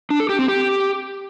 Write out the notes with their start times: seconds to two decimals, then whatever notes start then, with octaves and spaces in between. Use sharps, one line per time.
0.10 D4
0.20 A4
0.29 G4
0.39 C4
0.48 G4